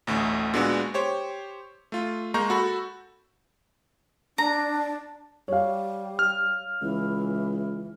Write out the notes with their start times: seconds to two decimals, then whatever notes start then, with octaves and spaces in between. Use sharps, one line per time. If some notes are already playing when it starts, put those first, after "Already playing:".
0.07 A1 D2 A2
0.54 A#2 G#3 B3 D4 F#4
0.94 G4 C5 C#5
1.92 A3 F4
2.34 G#3 A#3 A#5 C#6 G6
2.50 F#4 A4 B5
4.38 D4 A#5
5.48 G3 C#5 F5
6.19 F6
6.82 C#2 E3